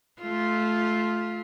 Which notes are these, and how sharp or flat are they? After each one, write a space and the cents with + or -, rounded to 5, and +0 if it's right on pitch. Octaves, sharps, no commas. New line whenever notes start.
A3 -20 F4 +0